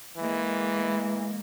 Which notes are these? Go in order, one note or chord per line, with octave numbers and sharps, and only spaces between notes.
E3 G#3 A#3